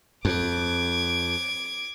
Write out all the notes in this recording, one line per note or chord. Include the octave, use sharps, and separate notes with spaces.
F2 D6 G#6